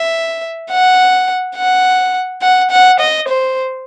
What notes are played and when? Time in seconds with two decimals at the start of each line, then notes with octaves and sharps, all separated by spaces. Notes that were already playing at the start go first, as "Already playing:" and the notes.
Already playing: E5
0.71 F#5
1.56 F#5
2.42 F#5
2.71 F#5
3.00 D#5
3.28 C5